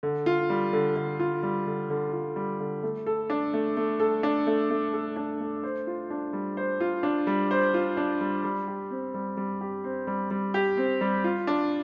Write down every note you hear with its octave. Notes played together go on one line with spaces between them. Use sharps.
D3
F4
G3
D3
D3
F4
G3
D3
D3
F4
G3
D3
A3
A4
D4
A3
A3
A4
D4
A3
A3
A4
D4
A3
C5
F4
D4
G3
C5
F4
D4
G3
C5
F4
D4
G3
G3
G4
C4
G3
G3
G4
C4
G3
G3
G4
C4
G3
F4
D4